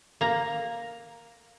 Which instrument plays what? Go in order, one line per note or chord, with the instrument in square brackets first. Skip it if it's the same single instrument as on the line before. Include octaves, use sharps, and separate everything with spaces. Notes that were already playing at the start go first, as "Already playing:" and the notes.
[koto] A#3 A#5